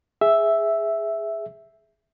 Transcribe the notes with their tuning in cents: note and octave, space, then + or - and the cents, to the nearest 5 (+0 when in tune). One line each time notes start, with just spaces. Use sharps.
G#4 +0 E5 +0